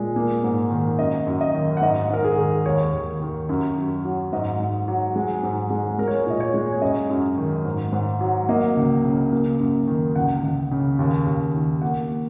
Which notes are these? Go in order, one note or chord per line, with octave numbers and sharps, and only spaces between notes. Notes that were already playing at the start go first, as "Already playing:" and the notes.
Already playing: A#2 G#3
A#3
G#2
D#3
F#2 D#5
F#2
D#5
D#3
F#5
G#2 D#5
G#2 A#4
G#4
D#3
D#2 C#5
D#2
D#3
F#2
F#2
F#3
G#2 D#5
G#2
F#3
G#3
G#2
G#3
G#3 A#4
C#5
A#4
A#2 D#5
C#5
G#3
C#5
F#2 D#5
F#2
D#3
G#2
G#2
F#3
A#3 D#5
C#2
C#3
A#3
F#2
D#3
C#2 F#5
C#2
C#3
D#2
D#2
D#3
A#3 F#5